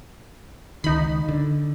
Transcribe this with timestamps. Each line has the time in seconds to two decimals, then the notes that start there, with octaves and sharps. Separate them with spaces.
0.84 C#2 D#3 D#4 B5
1.29 D3